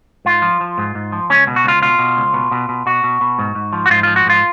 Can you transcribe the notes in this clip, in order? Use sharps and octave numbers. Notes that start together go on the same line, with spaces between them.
G#2 F4
F3
F3
G#2
G#2
F3
C#2 C#4
B2
F#4
C#2 F4
B2 F4
B2
C#2
B2
B2
B2
B2 F#4
B2
B2
G#2
G#2
F3
F#4
G#2 F4
F3 F4
F#4
G#2 F4